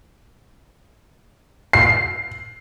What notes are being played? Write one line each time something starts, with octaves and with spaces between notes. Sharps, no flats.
C7